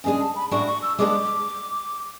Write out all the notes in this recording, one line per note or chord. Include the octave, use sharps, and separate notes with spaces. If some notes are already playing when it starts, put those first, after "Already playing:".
C#3 G#3 D4 G#4 G#5
A5
B5
A2 G#3 D4 F#4 C#6
C#6
E6
G#3 B3 D4 G#4 D6